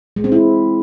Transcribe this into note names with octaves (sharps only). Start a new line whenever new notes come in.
G#3
C4
E4